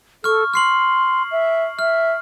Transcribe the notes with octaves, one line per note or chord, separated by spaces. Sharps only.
A4 C#6 F6
C6 F6 C7 F#7
E5
E5 F6